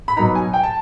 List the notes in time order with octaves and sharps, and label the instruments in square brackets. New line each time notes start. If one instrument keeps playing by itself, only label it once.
[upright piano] B5
B2 F#3 B3 D#4 A#5
G#5
G5
A5